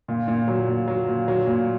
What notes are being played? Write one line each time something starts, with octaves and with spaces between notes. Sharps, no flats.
A#2
A#2
F#3
A#2
F#3
A#2
F#3
A#2